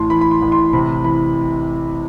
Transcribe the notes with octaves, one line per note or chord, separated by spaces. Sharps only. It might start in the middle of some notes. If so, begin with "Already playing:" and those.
Already playing: A1 A2 A5 C6
E3 B5
B5
C6
A1
C6
C3 B5
E3 B5